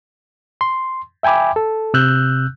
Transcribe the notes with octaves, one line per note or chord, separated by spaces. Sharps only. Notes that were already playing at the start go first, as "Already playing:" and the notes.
C6
E5 G5 G#5 B5 D6
A4
C3 E6 F#6 G6